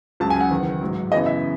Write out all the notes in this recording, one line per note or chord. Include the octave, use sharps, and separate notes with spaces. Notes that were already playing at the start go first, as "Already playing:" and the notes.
C#2 C#3 F#3 A5
G#5
F#5
F#1 E2 D#3
A1 G#2 F#3
F#2 C#3 E3 B3 D#5
E5